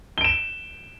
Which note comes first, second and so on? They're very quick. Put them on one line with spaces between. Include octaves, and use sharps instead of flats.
G7 D7 E7